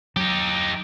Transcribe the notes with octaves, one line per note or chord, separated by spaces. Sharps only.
F#3 D#4 G4